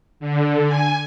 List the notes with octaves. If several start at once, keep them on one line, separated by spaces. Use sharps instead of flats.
D3
G#5